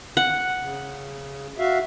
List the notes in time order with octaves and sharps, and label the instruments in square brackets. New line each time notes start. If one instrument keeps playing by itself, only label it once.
[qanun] F#5
[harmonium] C#3
F#4 E5 F5